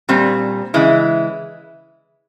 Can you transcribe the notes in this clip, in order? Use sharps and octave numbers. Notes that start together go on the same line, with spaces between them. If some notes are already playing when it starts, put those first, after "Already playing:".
A#2 G3 C4
C#3 E3 G#3 E4